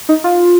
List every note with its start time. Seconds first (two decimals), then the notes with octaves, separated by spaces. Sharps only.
0.09 D#4
0.24 F4